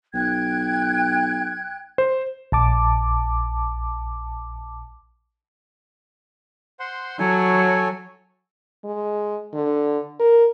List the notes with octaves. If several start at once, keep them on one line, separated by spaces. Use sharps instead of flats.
B1 G5 F#6 G#6
C5
A#1 A5 D6
C5 F#5 C6
F#3 A4 C#5 G#5
G#3
D3
A#4